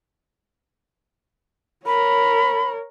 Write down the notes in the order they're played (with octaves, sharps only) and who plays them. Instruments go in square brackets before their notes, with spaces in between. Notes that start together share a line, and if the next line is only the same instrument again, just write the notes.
[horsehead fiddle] A#4 C#5 [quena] B5